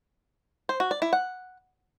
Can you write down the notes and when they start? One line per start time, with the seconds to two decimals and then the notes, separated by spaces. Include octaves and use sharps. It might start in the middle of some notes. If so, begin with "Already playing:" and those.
0.69 C5
0.80 F#4
0.91 D5
1.02 E4
1.13 F#5